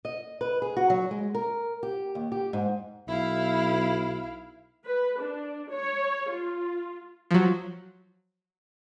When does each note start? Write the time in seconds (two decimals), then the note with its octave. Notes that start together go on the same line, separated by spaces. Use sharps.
0.05 D#5
0.41 B4
0.62 G#4
0.77 F#4
0.90 F#3
1.11 G#3
1.35 A#4
1.83 G4
2.15 D#2
2.32 G4
2.53 G#2
3.08 B1 E4 F5
4.85 B4
5.19 D4
5.70 C#5
6.30 F4
7.31 F3 F#3